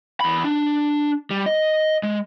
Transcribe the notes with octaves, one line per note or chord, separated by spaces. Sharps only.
E2 B5
D4
G3
D#5
G#3